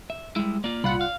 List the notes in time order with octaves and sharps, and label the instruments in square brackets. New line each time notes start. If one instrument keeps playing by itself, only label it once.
[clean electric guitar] E5
[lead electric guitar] G3 E4 [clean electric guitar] G#3
[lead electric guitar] A#3 F4 [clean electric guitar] D5
[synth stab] C2 F4 F#5 [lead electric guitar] A#2 B5
[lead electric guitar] F5